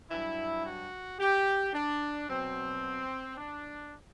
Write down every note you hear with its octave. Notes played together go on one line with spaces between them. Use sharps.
G2 F#3 E4
F#4
G4
D4
B2 F#3 C4
D4